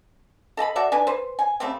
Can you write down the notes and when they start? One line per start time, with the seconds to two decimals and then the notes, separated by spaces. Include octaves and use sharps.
0.57 A4 D#5 A5 B5
0.76 F#4 A4 D5 E5
0.92 D4 B4 G#5
1.07 B4 C5
1.39 G#5
1.60 C#3 G3 A3 C4